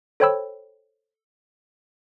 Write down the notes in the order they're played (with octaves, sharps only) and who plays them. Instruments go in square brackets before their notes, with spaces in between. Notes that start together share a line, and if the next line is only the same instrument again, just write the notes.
[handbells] A4 C5 C#5 G5 B5 E6